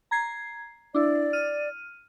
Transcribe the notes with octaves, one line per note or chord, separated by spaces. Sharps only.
A#5 G#6 C7
D4 E4 D5
F6 D#7